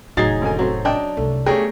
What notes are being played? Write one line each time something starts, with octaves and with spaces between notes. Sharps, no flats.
F1 A2 F#3 D#4 G#4 A6 C7
G#1 D3 G#5
F#3 A3 C4 C5
D4 D#5 G5
F#1 C2 A3
A3 B3 G4 G#4 A#4 C#5 G5